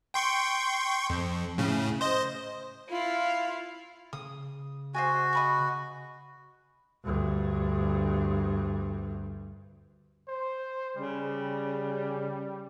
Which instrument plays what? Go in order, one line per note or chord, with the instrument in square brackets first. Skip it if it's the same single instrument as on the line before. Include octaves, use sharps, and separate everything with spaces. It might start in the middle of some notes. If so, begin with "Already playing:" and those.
[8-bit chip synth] G5 C6 C#6
F2
A2 C#3
C5 D#5
[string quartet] E4 F5 [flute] F4
[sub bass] C#3 [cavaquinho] D#6
[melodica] F#4 [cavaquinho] C5 D#5 G#5
[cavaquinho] D#5 B5 C#6
[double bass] D2 G2
[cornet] C5
[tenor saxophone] C#3 [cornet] G3